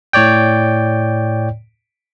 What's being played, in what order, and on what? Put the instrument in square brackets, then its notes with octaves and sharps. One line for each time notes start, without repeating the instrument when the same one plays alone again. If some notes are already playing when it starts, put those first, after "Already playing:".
[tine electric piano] A2 C#5 D5 G5